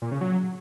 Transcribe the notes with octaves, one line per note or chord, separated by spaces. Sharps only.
A#2
C#3
F#3